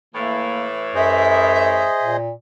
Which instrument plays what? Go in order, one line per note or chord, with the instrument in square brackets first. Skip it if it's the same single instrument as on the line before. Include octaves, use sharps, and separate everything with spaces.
[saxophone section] A2 E3 [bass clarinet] A#3
[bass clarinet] F#2 [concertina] G#4 C5 D#5 [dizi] E5
[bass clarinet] A#2